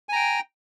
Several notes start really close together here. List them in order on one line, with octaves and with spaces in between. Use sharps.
G#5 A#5 G5